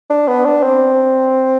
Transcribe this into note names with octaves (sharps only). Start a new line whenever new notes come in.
D4
B3
D4
C4